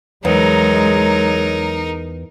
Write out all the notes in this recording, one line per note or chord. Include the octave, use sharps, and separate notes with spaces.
E2 F#3 G#3 D#4 A#4